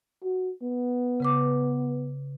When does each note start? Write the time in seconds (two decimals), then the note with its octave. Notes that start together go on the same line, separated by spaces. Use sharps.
0.24 F#4
0.63 B3
1.20 C#3 B4 D6